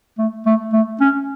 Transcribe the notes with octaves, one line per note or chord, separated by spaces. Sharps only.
A3
A3
A3
C#4